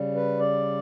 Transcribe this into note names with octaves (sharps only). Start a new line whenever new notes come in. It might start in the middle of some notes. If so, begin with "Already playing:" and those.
Already playing: C#3 G3
B4
D5